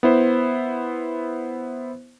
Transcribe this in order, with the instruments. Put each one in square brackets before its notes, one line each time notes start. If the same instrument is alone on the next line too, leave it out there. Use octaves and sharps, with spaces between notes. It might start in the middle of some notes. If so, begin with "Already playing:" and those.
[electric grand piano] B3 E4 C5